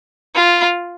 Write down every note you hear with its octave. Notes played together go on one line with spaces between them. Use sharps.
F4